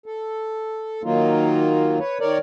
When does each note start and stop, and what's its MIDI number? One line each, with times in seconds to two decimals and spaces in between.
0.06 1.02 69
1.04 1.99 51
1.04 1.99 54
1.04 1.99 58
1.04 1.99 63
1.04 1.99 65
1.99 2.18 71
1.99 2.18 73
2.20 2.38 51
2.20 2.38 70
2.20 2.38 73
2.20 2.38 74